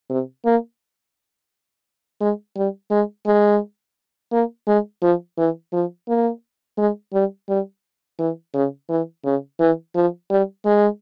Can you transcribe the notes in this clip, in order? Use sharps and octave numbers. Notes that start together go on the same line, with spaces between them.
C3
A#3
G#3
G3
G#3
G#3
A#3
G#3
F3
E3
F3
A#3
G#3
G3
G3
E3
C#3
E3
C#3
E3
F3
G3
G#3